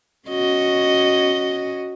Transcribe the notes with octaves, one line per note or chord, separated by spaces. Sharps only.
C#4 F#4 D#5